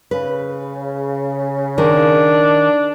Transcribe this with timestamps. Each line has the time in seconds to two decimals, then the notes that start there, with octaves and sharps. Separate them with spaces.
0.11 C#3 B4
1.78 D#3 D4 A#4